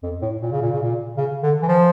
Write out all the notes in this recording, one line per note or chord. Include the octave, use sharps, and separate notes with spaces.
F2
A2
A#2
C#3
A#2
C#3
A#2
C#3
D3
E3
F3